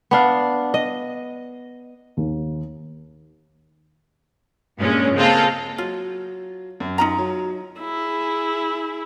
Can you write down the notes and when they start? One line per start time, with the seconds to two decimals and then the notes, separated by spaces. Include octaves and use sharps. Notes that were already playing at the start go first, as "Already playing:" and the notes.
0.11 B3 D4 F5
0.74 D#5
2.17 D#2
4.79 G2 A#2 G#3 C#4
5.14 C#3 G#3 A#3 C4 F4 A4
5.78 F#3 F4
6.80 F#2
6.98 D#4 F4 A#5
7.18 F#3
7.81 E4 G#4